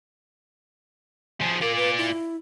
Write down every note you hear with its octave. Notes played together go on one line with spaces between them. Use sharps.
F3 G#4
F4 A#4 D5
B4
E4